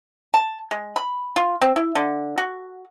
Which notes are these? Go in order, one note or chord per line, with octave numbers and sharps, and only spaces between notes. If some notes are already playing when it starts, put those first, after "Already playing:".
A5
G#3
B5
F4
C4
E4
D3
F#4